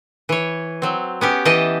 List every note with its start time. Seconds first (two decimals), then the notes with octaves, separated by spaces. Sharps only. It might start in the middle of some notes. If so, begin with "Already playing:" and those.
0.29 E3 C#5
0.82 F#3 C4
1.21 B3 C#4 G4
1.45 E3 D#5 G5 A5